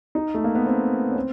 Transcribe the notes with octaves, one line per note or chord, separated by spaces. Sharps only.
D#4
A3
A#3
B3
C4
C#4
C4